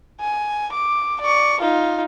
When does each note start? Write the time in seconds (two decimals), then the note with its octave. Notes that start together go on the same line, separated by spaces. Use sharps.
0.20 G#5
0.72 D6
1.21 D5 C#6
1.60 D#4 F4